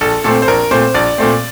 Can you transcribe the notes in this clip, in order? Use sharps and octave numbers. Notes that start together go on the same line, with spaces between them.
A#1 A4
A#2 A3 C4 A4
C5
A#1 A#4
A#2 A3 C4 C5
A#1 D5
A#2 A3 C4